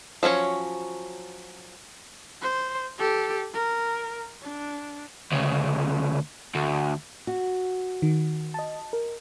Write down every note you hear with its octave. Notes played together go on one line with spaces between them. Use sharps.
F3 F#3 C#4 C#5
C5
G4 A4
A#4
D4
D2 C#3
D2
F#4
D#3
D#5 A5
A#4